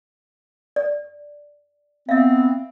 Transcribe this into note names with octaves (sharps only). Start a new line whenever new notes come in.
D5
B3 C4 E5 F5